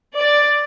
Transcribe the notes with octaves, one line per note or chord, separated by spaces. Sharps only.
D5